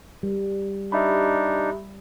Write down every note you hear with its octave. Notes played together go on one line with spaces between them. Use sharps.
G3
D4 D#4 G4 E5 B5